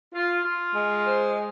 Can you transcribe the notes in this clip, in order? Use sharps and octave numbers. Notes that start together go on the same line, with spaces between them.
F4
F4
G#3
C5